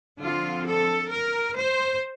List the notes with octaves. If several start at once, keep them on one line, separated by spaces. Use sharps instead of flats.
D3 F3 C4 F4
A4
A#4
C5